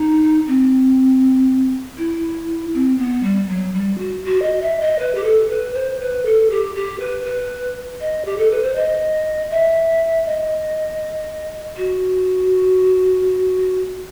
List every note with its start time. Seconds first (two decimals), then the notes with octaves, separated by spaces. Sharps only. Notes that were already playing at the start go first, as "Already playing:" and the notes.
Already playing: D#4
0.47 C4
1.97 E4
2.73 C4
2.97 B3
3.23 G3
3.49 F#3
3.73 G3
3.98 F#4
4.24 F#4
4.42 D#5
4.61 E5
4.80 D#5
4.99 B4
5.14 G4
5.23 A4
5.49 B4
5.74 C5
6.00 B4
6.25 A4
6.50 G4
6.75 G4
6.99 B4
7.24 B4
8.00 D#5
8.25 G4
8.38 A4
8.50 B4
8.62 C5
8.75 D#5
9.50 E5
10.26 D#5
11.77 F#4